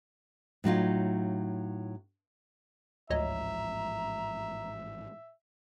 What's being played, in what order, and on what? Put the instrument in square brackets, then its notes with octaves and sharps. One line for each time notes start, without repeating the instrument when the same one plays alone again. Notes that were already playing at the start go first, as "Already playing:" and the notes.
[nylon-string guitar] A2 F#3 D#4 F4
[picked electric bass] A1 G#2 F3 [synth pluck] D2 C#5 D#5 [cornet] E5 [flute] A#5